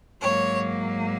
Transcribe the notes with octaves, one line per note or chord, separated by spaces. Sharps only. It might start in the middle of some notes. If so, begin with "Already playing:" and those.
G#2 F#3 A#3 C#5